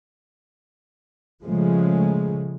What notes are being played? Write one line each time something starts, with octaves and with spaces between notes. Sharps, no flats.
C#3 F3 G#3 A3